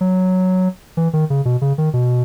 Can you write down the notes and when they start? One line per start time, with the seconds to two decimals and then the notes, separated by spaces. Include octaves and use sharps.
0.01 F#3
0.97 E3
1.13 D#3
1.30 C#3
1.45 B2
1.61 C#3
1.78 D#3
1.93 B2